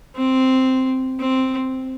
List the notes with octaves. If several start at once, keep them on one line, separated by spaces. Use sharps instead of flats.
C4
C4